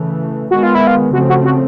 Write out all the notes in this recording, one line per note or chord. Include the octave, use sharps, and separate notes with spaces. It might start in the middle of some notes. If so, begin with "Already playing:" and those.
Already playing: C#3 E3 A3
D#3 G#3 B3 F#4
F4
E4
F4
C#3 F3 A3 C4 F#4
F#4
F#4